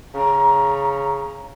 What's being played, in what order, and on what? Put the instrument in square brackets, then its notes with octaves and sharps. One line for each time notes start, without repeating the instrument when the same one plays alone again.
[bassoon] C#3 [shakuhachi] A#5